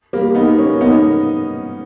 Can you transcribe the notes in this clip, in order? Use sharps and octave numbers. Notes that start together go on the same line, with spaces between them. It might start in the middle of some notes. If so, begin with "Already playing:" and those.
G3 A#3
B3 D#4
A#3 C#4
B3 D#4